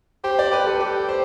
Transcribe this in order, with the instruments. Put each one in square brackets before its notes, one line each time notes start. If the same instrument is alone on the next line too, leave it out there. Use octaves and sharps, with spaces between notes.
[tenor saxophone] G4 [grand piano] C5
[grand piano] D5
[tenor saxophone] G4 [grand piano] B4
[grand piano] A4
[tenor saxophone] G4 [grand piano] B4
[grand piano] C5